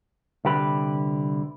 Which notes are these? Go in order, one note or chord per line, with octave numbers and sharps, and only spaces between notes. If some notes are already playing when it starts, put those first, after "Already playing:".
C2 D3 G4 B4